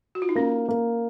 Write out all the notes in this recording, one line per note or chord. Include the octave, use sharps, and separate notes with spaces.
F#4
F4
D#4
A#3 C#4
A#3